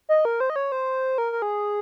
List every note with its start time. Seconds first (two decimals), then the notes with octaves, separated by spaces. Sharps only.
0.09 D#5
0.25 A#4
0.40 C5
0.50 D#5
0.56 C#5
0.72 C5
1.18 A#4
1.32 A#4
1.42 G#4